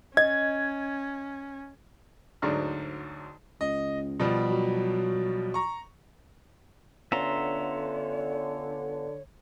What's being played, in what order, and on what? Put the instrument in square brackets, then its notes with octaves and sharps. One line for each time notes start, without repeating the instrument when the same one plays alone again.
[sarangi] C#4 [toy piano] D#5 [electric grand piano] G#6
[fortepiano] D2 G#2 F#3 D5 C#6 F6
[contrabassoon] C#2 [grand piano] D#5
[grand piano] B2 F3 G3
[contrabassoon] F#3
[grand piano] A#5 C#6
[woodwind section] D3 [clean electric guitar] B3 C#4 F4 [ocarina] C#5 [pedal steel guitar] E5 A#5 C6